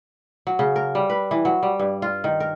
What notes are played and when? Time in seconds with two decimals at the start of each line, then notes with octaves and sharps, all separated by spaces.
0.47 F#3
0.59 C#3
0.76 A#4
0.95 G3
1.10 B4
1.31 E3
1.45 F#3
1.63 G3
1.80 G2
2.02 F4
2.24 D#3
2.40 A#4